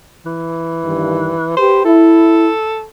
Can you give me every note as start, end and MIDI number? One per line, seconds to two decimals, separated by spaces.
0.26 1.55 52
0.83 1.33 43
0.83 1.33 51
1.57 1.84 67
1.57 1.84 71
1.57 1.83 72
1.85 2.49 64
1.85 2.85 69